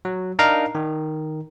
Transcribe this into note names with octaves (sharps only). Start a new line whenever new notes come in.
F#3
D4 D#4 A#4 F5 A#5
D#3